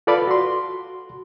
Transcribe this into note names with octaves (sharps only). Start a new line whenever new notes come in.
F4 A4 B4 D5 F5 B5
F#4 C6